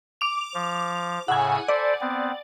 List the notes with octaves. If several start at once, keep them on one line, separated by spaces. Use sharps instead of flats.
D6 F7
F3
A2 C#3 F#5 G#5 E6
A4 C5 D5 B5
B3 C4